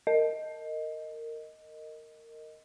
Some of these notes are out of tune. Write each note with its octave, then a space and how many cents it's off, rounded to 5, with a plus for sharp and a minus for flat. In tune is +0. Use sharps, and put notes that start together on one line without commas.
A#4 -20 D#5 +0